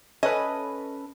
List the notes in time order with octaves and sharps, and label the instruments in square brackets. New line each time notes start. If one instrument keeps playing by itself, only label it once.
[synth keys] C#4 A4 B4 [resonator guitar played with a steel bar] D#5